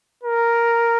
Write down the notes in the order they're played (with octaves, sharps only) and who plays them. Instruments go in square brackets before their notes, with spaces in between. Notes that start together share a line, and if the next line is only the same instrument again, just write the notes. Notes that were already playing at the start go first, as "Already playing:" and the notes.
[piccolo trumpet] A#4